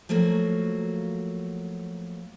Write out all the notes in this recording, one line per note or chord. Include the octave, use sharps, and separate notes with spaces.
F3 F#3 A3 A#3 F#4